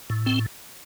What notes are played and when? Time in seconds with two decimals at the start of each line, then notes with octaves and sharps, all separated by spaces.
0.10 A2
0.26 C4